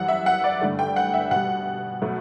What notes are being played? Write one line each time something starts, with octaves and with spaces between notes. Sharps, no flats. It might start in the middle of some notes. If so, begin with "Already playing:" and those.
Already playing: F#2 E3 G3 F#5
E5
F#5
D5
G2 D3 A3
G5
F#5
E5
B2 G3 F#5
B2 F#3 A3